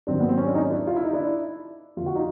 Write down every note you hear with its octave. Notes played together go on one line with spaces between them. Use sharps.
G#2 D#3 F#3 C4 D4
B3
C4
C#4
D4
C#4 D#4
D4 E4
F4
E4
D#4
D4 E4
F2 D3 F3 F4
F#4
D#4 F4